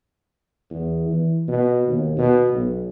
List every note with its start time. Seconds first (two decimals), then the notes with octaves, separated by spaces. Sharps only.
0.70 E2
1.09 E3
1.48 B2
1.88 D#2
2.18 B2
2.54 B1